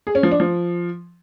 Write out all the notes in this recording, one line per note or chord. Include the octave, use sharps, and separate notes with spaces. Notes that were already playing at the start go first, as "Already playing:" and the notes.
G#4
C#4
F3
D4
F3